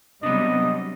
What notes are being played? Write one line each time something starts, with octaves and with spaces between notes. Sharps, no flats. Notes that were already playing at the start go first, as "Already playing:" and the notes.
C3 F#3 G3 B3 D4 D#5